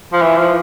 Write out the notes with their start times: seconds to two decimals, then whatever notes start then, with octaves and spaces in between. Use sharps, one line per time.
0.13 F3
0.22 E3
0.38 F3